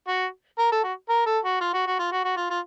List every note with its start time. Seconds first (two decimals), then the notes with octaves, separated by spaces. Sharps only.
0.08 F#4
0.59 A#4
0.72 A4
0.84 F#4
1.09 A#4
1.26 A4
1.44 F#4
1.61 F4
1.74 F#4
1.87 F#4
1.99 F4
2.12 F#4
2.24 F#4
2.37 F4
2.50 F4